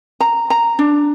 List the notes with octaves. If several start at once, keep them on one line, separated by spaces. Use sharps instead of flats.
A#5
A#5
D4